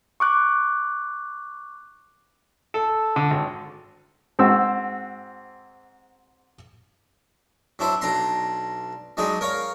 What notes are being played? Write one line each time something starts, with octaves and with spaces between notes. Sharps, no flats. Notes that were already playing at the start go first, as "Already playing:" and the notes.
C#6 D6 F#6
A4
D3
G#1
G#2 C4 F#4 E6
F#3 D4 E4 C5
B1 D4 A#5 C6
F#3 G#3 D4 D#4 G#4
A#4 C#5 F5